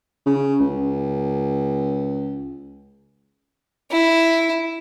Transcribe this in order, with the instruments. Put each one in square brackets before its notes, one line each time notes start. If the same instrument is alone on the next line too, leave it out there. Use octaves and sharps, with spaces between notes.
[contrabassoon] C#3
C#2
[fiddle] E4